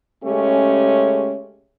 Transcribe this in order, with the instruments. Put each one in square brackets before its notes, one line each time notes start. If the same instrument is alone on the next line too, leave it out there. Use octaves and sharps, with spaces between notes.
[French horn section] C#3 G#3 A3 C#4 G4